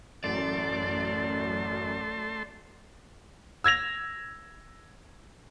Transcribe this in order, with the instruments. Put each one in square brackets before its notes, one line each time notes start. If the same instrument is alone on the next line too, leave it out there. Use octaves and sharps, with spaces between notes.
[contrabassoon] A1 [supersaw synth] F#2 [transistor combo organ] A3 A5 C6 [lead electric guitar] D5
[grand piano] E6 G#6 A#6 F7